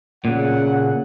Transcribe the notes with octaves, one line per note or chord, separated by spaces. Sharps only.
A#2 C#3 F#5